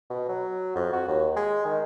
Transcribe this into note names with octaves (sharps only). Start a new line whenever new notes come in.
B2
F#3
F2
F#4
D#2
G#3
D#3